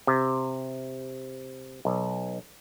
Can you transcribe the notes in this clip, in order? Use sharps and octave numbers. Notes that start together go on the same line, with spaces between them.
C3
B1